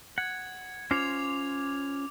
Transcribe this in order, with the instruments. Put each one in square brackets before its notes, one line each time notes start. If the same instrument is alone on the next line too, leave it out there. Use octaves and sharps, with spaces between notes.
[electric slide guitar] F#5 [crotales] G#6
[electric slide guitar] C#4 F4 C5 [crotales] D6 G#6 F7